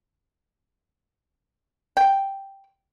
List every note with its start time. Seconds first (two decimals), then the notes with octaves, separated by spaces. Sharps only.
1.97 G5